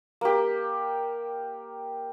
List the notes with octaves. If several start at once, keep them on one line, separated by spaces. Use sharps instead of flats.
A#3 G4